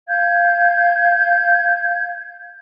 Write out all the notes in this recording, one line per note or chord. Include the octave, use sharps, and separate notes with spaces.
F5 G6 G#6